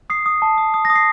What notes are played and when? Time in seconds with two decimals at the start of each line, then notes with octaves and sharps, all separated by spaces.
0.10 D#6 C7
0.26 D#6
0.42 A5
0.58 D#6
0.74 D#6
0.85 D#6 A#6
0.96 C7